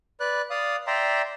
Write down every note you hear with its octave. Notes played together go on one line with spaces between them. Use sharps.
B4 D5 F#6
D5 F5 D#6
D5 E5 G5 A#5 C6